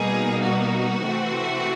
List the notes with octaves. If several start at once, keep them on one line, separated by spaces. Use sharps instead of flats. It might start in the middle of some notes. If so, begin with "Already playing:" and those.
Already playing: B2 G3 A#3 D#4 G#4
F#4
C3 E3 A3 C4